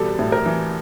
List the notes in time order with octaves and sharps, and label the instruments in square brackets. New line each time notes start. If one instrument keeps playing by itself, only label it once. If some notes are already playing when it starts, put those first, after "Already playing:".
Already playing: [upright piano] E2 B2 G3 A4
A2
A#4
E3